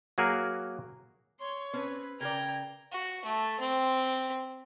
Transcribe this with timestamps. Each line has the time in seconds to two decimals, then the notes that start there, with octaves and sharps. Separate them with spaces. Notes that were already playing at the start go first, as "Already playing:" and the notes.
0.18 F#3 A#3 F#4 G#4 A#4
1.40 C#5 C6
1.73 C4 C#4 B4 C5
2.20 C#3 A#4 D5 G5 A#5 G#6
2.92 F#4
3.25 A3
3.60 C4